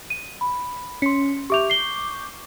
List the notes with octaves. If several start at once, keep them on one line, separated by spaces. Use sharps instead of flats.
D#7
B5
C#4 C6 B6 C#7
G4 E5 C#6 D6 G6 F7
C7 G7